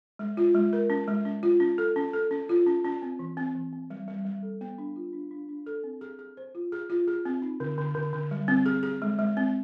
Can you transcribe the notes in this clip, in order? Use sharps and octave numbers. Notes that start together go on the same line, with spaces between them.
G#3
F4
G#3
A#4
C#4
G#3
C#4
F4
C#4
A4
C#4
A4
C#4
F4
C#4
C#4
C4
E3
C4
E3
C4
G3
G3
G3
A4
B3
D4
F4
D4
D4
D4
A4
C4
G#4
G#4
C5
F4
G#4
F4
G#4
C4
D#4
D3
D3
D3
D3
G3
C4
G#4
G#4
G#3
G#3
C4